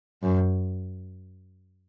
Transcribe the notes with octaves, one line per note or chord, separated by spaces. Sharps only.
F#2